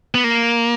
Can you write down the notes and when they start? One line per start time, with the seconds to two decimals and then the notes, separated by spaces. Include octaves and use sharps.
0.15 B3
0.24 A#3